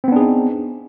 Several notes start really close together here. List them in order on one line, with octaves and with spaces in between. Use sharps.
C4 B3 D4 G#4 D#4